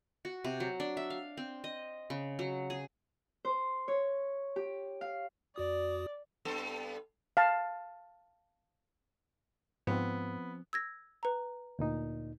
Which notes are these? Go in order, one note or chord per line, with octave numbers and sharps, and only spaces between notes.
F#4
C3
F#3
D4
E5
F5
C4
D#5
C#3
F#3
G#4
C5
C#5
G4
F5
F2 F#4 D5 D#6
G2 B3 A4
F5 A5
G#2 F3 B3 C4
E6 G#6 A#6
B4 A#5
D2 A#2 D#4